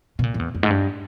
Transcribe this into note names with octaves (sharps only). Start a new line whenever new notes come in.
B2
A#2
F2
E2
F2
G#2
G2